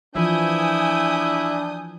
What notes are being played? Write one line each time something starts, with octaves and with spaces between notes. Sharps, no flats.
E3 F3 D4 E4 G#5 D#6 G6